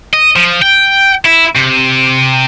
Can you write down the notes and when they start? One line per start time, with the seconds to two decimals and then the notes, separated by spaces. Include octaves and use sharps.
0.14 D#5
0.36 F3
0.62 G5
1.25 E4
1.55 C3